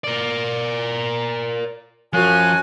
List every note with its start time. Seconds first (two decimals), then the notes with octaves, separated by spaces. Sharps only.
0.04 A#4 D5
2.13 F#2 F3 F#4 G#5